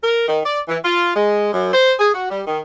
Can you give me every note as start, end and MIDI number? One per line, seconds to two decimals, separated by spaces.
0.03 0.25 70
0.28 0.40 51
0.45 0.60 74
0.68 0.78 52
0.84 1.11 65
1.15 1.51 56
1.53 1.72 42
1.73 1.93 72
1.99 2.11 68
2.14 2.28 66
2.30 2.41 55
2.46 2.59 51